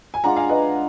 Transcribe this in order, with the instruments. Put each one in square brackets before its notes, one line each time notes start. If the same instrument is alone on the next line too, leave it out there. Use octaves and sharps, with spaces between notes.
[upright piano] G#5
[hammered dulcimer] G#3 D4 F4 [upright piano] F#5 A#5
[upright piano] F5 G#5
B4 D#5